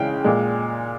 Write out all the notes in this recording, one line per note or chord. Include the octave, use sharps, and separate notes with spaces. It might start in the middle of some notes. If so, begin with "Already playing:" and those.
Already playing: C#3 E3 G#3 G5
A#2 G#3